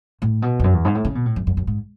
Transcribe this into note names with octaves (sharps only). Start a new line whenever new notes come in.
A2
B2
E2
F#2
E2
G#2
A2
C#3
B2
A2
F#2
F#2
F#2
G#2